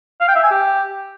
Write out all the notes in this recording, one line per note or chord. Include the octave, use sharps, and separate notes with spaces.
F5
G5
E5
G#5
G4